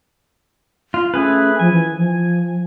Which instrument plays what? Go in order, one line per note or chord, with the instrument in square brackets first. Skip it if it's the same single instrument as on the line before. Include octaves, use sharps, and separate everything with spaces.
[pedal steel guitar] F4
[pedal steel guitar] A3 G#4 B4 [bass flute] C#4
[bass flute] F3 [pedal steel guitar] G#5
[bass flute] E3
F3